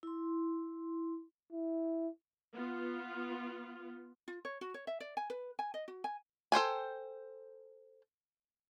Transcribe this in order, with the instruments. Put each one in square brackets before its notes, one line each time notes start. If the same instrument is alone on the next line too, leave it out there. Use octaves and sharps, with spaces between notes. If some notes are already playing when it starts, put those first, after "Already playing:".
[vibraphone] E4 C6
[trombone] E4
[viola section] B3 F4
[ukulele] F4
C#5
F#4
C#5
E5
D5
G#5
B4
G#5
D#5
F#4
G#5
[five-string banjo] A4 C5 G5 G#5